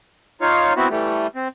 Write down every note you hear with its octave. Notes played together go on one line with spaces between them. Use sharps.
D#4 F4 C#5 F5
B3 C4 E4 F#4
E3 G3 A3
C4